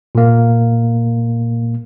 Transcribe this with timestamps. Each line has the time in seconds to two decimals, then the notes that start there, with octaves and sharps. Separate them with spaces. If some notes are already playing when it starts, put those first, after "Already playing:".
0.15 A#2 A#3